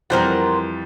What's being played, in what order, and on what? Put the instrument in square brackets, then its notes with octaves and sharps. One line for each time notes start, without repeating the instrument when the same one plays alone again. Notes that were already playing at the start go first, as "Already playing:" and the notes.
[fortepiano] F2 E3 G3 [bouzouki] A#4 C5 F#5